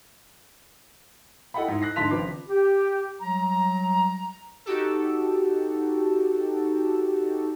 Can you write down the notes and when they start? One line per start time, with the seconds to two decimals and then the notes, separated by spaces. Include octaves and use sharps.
1.54 E4 A4 D#5 F#5 G5 B5
1.68 G#2 E4
1.82 F#6 A#6 C7
1.96 G#2 D3 A5 C6 B6 F7
2.11 G#1 C#3 F3 B4 D6
2.48 G4
3.21 F#3 G3 A#5
4.66 D#4 F#4 G4 A4